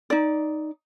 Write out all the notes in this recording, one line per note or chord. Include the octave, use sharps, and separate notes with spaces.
D#4 D5